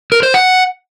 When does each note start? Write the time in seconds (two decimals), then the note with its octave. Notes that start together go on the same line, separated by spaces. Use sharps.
0.12 A#4
0.23 C5
0.34 F#5